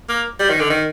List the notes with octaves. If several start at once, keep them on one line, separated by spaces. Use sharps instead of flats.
A#3
G3
D#3
D3
D#3